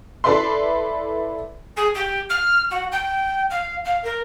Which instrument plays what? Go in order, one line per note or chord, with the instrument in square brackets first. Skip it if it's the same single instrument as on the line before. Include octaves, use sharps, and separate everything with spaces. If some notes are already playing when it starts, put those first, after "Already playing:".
[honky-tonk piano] E4 A4 B4 D5 E5 C6
[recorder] G#4
G4
F6
F#4
G5
F5
F5
A#4